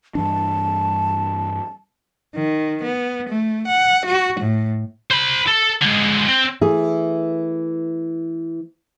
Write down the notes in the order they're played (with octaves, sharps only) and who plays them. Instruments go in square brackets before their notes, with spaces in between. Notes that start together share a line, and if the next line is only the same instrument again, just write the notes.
[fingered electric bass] G2 E3 D4 [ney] A5
[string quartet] D#3
B3
A3
F#5
F#4
A2
[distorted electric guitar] C5 B5
A4
D3 G#3
C4
[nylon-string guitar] E3 A3 G#4